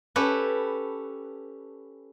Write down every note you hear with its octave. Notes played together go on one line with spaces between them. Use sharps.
C#4 G4 A4 B4